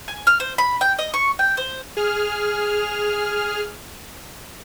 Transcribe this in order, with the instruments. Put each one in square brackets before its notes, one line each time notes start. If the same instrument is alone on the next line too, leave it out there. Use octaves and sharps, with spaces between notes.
[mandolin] G#5
F6
C5
B5
G5
D#5
C#6
G5
C5
[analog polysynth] G#4 F6